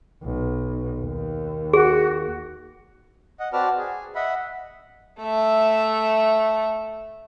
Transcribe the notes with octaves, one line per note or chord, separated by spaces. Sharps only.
B1
D#2
F#4 G#4
D#5 F#5
C4 F#4 B4 D5 A5 F6
G#4
D#5 E5 F#5 B5
A3 E5